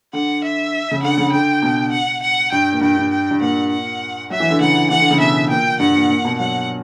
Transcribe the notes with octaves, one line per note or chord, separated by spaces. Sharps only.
D3 F#5
E5
C#3
D3 F#5
C#3
D3 G5
B2
F#5
F#5
G2 G5
A#2
G2 G5
G2
G5
G2
A#2 F#5
F#5
F#3 E5
E3
D3
C#3 F#5
E3 F#5
D3
C#3
B2 E5
A#2 G5
G2 F#5
A#2
A#2
B2
F#3 F#5